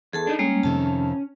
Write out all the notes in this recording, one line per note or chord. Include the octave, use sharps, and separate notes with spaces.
E2 G#4 A4 A5
D4 D#4
G3 G#3 A#3 C#4
F2 C3 D#3 A5